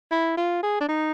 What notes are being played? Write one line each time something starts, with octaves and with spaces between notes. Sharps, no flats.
E4
F4
G#4
D4
D#4